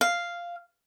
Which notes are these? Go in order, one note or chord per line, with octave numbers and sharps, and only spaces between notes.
F5